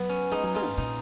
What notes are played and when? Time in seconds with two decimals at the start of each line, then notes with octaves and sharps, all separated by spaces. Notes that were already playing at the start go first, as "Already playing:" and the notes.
Already playing: F#3 B3
0.09 C#4
0.32 G#3 D#4
0.43 F#3
0.55 G#3 F4
0.67 G#2
0.78 A#2 D#4